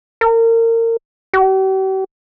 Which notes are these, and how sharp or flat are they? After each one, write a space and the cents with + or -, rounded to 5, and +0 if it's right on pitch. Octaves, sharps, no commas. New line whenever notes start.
A#4 -30
G4 -45